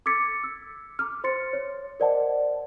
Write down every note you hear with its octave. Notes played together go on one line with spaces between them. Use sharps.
D6 E6 G#6 A6 B6 C#7
E6
A#5 D6 F6
C5 C6 A6 C#7
C#5
A#4 C5 D5 D#5 F#5 A5